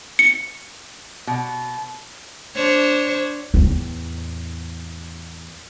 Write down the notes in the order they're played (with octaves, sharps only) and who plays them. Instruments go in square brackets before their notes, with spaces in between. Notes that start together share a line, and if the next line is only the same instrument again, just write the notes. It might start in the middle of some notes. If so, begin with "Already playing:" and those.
[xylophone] C#7
[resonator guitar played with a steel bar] B2
[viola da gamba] D4 C5 C#5
[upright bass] E2 A2